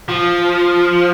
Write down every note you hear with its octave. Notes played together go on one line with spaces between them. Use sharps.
F3